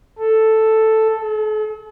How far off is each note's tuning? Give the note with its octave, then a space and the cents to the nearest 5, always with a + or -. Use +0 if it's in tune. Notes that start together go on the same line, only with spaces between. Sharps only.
A4 +0
A4 -45